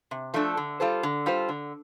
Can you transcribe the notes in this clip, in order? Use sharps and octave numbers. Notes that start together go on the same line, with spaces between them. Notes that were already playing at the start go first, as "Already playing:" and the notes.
C3
F3 A3 D4 A4
D3
G3 F4 A4 C5
D3
G3 F4 A4 C5
D3